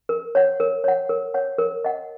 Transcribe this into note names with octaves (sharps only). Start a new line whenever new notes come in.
A#4
C#5 F#5
A#4
C#5 F#5
A#4
C#5 F#5
A#4
D#5 F#5